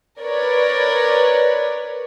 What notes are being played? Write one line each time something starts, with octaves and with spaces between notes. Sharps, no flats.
A#4 B4 C#5 D5